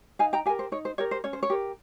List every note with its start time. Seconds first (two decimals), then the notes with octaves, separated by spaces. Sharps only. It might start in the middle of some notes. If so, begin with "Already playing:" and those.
0.19 D#4 F5 G#5
0.33 G5 A#5
0.46 G4 F5 G#5
0.49 A#4
0.59 C5
0.72 D#4 C#5
0.85 C5
0.98 G4 A#4 C#5
1.11 C5
1.24 C#4 C#5
1.33 C5
1.43 C#5
1.50 G4 A#4